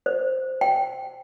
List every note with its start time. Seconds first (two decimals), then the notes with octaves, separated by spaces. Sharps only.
0.06 C5
0.61 G5